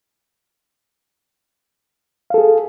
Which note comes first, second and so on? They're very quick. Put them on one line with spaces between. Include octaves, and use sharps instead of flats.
F5 A4 G#4